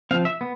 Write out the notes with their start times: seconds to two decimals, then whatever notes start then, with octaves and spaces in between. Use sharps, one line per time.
0.11 C4 F5
0.13 F3
0.25 E5
0.41 B3